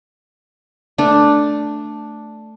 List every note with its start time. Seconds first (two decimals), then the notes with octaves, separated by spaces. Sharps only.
0.98 A3 D4